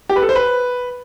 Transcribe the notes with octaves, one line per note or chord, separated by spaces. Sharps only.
G4
B4
A4
C5
B4